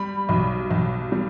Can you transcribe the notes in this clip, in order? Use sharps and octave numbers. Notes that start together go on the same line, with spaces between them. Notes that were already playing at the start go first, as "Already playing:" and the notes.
Already playing: G3 B5
B1
B1
G3